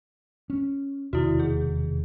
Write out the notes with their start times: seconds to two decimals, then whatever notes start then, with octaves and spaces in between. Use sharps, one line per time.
0.50 C#4
1.13 E1 D#2 C3 E4 F#4
1.40 G#4